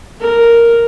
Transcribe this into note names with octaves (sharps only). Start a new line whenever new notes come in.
A#4